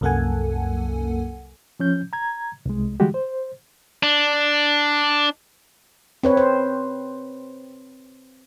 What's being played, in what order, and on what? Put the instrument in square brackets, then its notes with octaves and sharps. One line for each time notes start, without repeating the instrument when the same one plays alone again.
[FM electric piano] C2 F#2 A#3 A4 F#5 G#5
[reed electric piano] F3 C#4 G6
A#5 G#6
C2 G#3
D3 E3 G3 G#3 F#4 G4
C5
[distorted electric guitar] D4
[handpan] C4 B4 C#5
C5